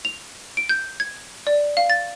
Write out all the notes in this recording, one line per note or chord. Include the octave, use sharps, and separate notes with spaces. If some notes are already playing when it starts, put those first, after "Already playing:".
F7
D7
G6
G#6
D5
F5
A6